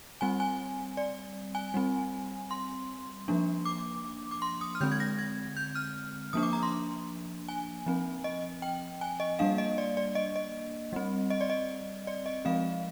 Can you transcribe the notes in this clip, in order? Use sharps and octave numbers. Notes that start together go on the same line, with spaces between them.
G3 C4 G#5
G#5
D5
G#5
G3 C4
C6
F3 A#3 D4
D6
D6
C6
D#6
F6
D3 G#3 C4 G6
G#6
A#6
G#6
G6
F6
F3 A#3 D4 D#6
D6
A#5
C6
G#5
F3 C4
D#5
G5
G#5
D#5
G3 A#3 D4 F5
D#5
D5
D5
D#5
D#5
G3 C4
D#5
D5
D#5
D5
D#5
F3 G#3 C4 F5